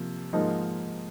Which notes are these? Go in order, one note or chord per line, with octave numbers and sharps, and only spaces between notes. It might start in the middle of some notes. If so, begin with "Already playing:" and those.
Already playing: C3 F3 A#3
G#2 F3 A#3 D#4